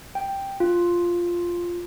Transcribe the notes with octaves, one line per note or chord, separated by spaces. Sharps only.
G5
F4